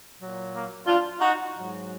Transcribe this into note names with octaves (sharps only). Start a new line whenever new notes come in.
A#2 F#3
A#3
D4 F4
D#4 F#4
G#2 F#3